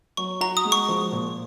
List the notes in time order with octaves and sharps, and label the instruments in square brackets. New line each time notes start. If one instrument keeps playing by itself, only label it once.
[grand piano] F#3 [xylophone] C#6
[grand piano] F#4 [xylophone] A#5
[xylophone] D#6
[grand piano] G#3
[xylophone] C#6
[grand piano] F3
A#2